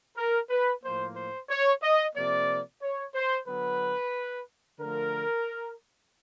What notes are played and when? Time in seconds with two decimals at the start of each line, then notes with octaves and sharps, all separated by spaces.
0.16 A#4
0.50 B4
0.83 A2 F3 A#3 C5
1.16 C5
1.49 C#5
1.82 D#5
2.15 C3 F3 A#3 D5
2.82 C#5
3.15 C5
3.47 D3 F#3 B3 B4
4.79 D3 F3 A3 A#4